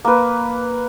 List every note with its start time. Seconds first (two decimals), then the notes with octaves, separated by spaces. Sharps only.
0.05 A#3 B4